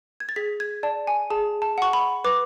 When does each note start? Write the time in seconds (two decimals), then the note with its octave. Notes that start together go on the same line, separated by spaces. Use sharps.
0.20 G#6
0.29 A6
0.36 G#4 B6
0.60 G#6
0.83 D5 A5
1.07 G#5
1.30 G#4 A5
1.62 A5
1.78 F#5 C#6
1.93 B5
2.24 B4 D6